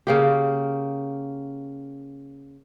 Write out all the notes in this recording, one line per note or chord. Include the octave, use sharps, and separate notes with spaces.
C#3 A#3 G4